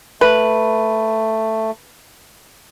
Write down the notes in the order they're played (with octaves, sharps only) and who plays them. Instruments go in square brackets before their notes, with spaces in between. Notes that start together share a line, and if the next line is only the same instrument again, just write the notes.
[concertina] A3 [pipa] B4